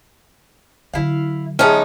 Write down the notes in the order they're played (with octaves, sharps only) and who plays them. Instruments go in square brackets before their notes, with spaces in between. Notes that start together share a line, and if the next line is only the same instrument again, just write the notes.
[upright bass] D3 F#3 [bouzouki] E4 F5
[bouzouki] G#3 B3 G4 [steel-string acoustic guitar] C#4 D#4 [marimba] E5 A5 F6